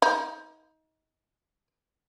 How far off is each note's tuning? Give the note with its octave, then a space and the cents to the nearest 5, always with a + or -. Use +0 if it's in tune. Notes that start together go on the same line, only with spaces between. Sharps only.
D#4 +25